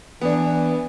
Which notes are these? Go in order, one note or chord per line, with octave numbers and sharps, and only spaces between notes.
E3 B3 D4